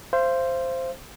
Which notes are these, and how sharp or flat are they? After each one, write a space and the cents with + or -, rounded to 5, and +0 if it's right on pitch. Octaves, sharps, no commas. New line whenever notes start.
C5 +0 F5 -40